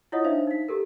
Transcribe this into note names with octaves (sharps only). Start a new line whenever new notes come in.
E4 F4 C#5 D#5 F#5 D#6
D4 D#4 C5 E5 F5
D#4 B6
G4 A4 A#4